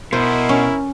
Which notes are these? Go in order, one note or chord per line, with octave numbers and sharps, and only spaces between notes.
B2 E4 A#4 C5
C#4